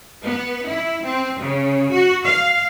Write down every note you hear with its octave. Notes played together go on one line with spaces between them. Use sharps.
B3
E4
C4
C#3
F#4
F5